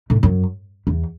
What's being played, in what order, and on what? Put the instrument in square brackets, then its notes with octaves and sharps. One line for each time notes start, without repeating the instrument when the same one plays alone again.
[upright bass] A2
F#2
E2